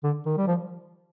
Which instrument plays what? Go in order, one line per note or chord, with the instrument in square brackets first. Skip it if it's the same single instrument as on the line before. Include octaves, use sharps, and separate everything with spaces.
[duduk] D3
D#3
G3
F3